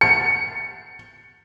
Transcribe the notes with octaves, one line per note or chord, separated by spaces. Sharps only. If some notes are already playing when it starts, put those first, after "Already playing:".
C#7